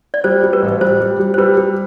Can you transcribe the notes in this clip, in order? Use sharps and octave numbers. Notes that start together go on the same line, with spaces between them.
D5
G3 C5
G3
B4
A1
G3 C5
G3
G3
C5
G3 B4
G3